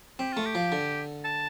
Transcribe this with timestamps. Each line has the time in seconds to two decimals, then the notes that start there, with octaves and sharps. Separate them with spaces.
0.19 C4 G4
0.33 A3 F4
0.46 G4
0.55 F3
0.72 D3
1.24 A5